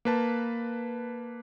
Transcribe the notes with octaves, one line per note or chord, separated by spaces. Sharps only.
A#3 B4 A5